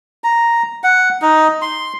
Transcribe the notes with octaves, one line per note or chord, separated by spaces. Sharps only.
A#5
F#5
D#4
C6